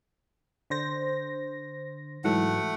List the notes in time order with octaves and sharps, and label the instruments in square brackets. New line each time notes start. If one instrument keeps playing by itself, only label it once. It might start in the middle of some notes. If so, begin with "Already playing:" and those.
[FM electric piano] D3 C5 A#6
[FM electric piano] G#2 E3 F#3 [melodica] A3 F#5